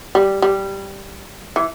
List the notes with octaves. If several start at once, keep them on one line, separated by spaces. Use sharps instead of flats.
G3
G3
E3